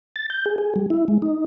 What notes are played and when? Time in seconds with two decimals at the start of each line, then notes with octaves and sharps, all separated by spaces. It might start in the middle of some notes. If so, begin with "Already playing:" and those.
0.16 A6
0.30 G6
0.46 G#4
0.58 G#4
0.76 G3
0.90 E4
1.08 G#3
1.22 D#4